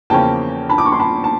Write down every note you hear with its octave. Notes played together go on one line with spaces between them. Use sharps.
E2 C#3 F3 A#3 C#4 G5 A5
A5 B5
D6
C#6
C6
A5 B5
A5